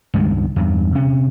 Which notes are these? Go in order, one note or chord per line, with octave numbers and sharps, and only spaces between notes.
C#2 G2 D#3 G#3
E2 G2
C3 C#4